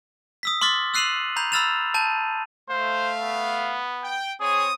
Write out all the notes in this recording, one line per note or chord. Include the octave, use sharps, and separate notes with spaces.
D#6 E6 B6
C6 D6 F6 A6 B6
E6 F#6 C7 D#7 F7 F#7
A#5 B5 G6 F7
B5 E6 F6 A6 E7 F7
A5 G6 D#7
A3 C5 F5
B3
G5
C4 G#4 C#5 D#6